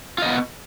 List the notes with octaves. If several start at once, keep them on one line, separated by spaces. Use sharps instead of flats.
B3 F4 D#5